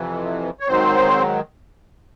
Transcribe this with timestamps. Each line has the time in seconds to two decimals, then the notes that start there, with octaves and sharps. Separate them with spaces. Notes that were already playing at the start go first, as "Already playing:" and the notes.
Already playing: F2 C3 E3
0.60 C#5
0.68 G#2 D#3 F#3 C4 C5